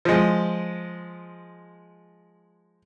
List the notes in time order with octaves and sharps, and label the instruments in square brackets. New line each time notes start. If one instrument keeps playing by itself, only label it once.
[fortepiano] F3 G#3